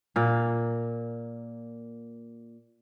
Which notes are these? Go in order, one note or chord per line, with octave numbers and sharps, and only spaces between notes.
A#2 A#3